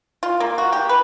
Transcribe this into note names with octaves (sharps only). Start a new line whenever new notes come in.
F4
A#3
F#4
G4
B4